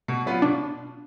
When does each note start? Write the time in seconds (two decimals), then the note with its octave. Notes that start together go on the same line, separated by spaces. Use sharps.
0.08 B2
0.26 F#3 B3 F4
0.42 B2 D4